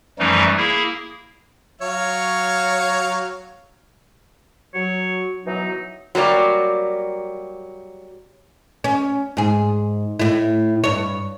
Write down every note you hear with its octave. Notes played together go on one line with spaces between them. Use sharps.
F#2 E3 F3 G3 A3 D#4
A#3 E4 G#4
F#3 C#5 F5
F#3 C#5
B2 E3 F#3 D#4
F#3 G3 A#3 D5
C#4
G#2 G#4
A2 E4
G2 C#5